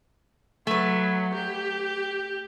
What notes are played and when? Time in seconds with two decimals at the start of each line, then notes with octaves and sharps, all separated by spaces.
0.67 F#3 A3 B4
1.34 G4